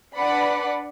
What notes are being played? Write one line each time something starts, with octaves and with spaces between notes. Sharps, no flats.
D4 B4 D5 F#5 B5